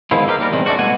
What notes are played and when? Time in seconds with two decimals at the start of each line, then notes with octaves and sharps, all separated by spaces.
0.11 D#3 F3 G#3 B3 E4 F4
0.27 D#4 E4 G4 A#4 F5
0.39 D#2 G3 A#4
0.51 E2 A2 C3 D#3 G#3
0.66 G#3 A3 B3 D4 F#4
0.79 B2 A3 F#5 G#5